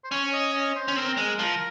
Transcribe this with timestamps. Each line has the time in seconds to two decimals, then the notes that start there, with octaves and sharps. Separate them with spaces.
0.04 C5
0.11 C#4 C#5
0.33 D#5
0.53 D#5
0.75 C5
0.88 C#4
0.96 C4 A#4
1.17 G#3
1.39 F3